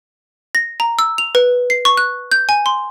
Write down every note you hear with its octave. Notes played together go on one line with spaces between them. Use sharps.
A#6
A#5
E6
F7
B4
C7
C#6
F#6
G6
G#5
C6